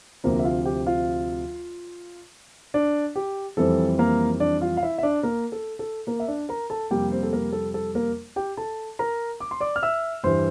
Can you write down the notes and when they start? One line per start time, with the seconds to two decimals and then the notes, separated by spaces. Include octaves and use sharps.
0.24 D2 C3 F3 A#3 C4 A#4
0.39 E5
0.45 F4 F5
0.65 G4 G5
0.87 F4 F5
2.74 D4 D5
3.16 G4
3.57 F2 E3 G3 C4 A4
3.99 A#3 A#4
4.40 D4 D5
4.61 F4 F5
4.77 F5
4.83 E4 E5
4.98 E5
5.03 D4 D5
5.23 A#3 A#4
5.52 A4
5.79 A4
6.07 A#3 A#4
6.20 E5
6.28 D4 D5
6.49 A#4 A#5
6.70 A4 A5
6.91 F2 C3 G3 A#3 G4 G5
7.11 C4 C5
7.23 A4
7.33 A#3 A#4
7.53 A4
7.74 A4
7.95 A#3 A#4
8.36 G4 G5
8.57 A4 A5
8.99 A#4 A#5
9.40 D6
9.51 C6
9.61 D5 D6
9.76 F6
9.83 E5 E6
10.24 G2 E3 G3 C5 C6